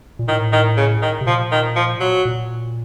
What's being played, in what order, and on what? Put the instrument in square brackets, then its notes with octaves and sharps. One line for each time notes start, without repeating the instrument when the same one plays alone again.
[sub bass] A#2
[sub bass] A2 [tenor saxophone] D#3
[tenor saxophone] D#3
C#3
D#3
[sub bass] C3
[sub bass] A#2 [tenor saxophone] F3
[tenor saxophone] D#3
F3
F#3
[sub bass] A#2